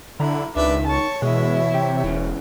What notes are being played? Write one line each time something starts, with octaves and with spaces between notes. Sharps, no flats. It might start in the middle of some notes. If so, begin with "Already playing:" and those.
B1 D3 E4 A#5
C#2 D#3 D4 B4 E5 D6
C#5 A5 C#6
B2 E3 G#3 E4 E5
C3 G4
E1 C#3 E3